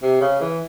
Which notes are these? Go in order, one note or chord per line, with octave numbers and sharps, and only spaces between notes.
C3
C#3
E3